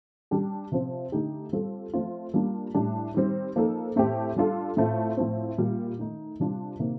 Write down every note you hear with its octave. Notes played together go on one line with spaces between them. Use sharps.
G3 D4 G4
C3 F3 C4
D3 A3 D#4 G4
G3 C4 F4 A4
F3 A3 C4 F4
G3 A#3 D4 F4
A2 G3 D4 G4
D#3 G3 C4
F3 A#3 D#4 A4
A2 A3 C4 G4
G3 D4 F4 A4
A2 A3 C4 F4
A2 F3 C4
A#2 G3 A#3
D#3 A3 D#4
C3 G3 D4 F4
C3 D#3 A#3